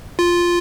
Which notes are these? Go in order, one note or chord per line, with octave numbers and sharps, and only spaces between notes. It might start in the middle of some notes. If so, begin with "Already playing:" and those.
F4